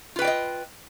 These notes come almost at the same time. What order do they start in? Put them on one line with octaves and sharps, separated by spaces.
F4 B4 G5 D5 D#5